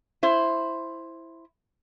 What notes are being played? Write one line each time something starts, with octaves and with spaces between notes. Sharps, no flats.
E4 C5